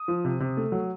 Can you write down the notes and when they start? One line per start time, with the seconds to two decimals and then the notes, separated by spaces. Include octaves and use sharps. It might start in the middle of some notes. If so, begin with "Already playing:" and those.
Already playing: D#6
0.08 F3
0.25 C3
0.40 C3
0.57 A3
0.72 F#3